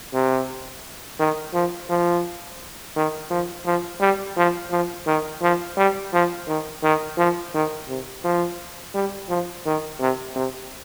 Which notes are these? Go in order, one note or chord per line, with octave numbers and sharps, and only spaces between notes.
C3
D#3
F3
F3
D#3
F3
F3
G3
F3
F3
D#3
F3
G3
F3
D#3
D#3
F3
D#3
C3
F3
G3
F3
D#3
C3
C3